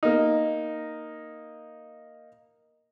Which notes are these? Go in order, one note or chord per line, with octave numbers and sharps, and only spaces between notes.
A#3 D#4